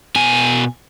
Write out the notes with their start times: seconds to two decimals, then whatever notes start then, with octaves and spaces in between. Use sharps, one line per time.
0.16 B2 G#5